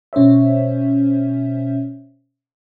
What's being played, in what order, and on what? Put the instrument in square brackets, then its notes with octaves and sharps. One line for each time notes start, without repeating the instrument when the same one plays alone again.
[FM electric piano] B2 C#4 C5 C#5 E5